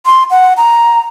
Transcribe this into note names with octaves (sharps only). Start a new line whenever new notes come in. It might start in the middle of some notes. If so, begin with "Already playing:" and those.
C6
F#5
A#5